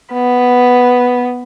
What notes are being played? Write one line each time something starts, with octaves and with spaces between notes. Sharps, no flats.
B3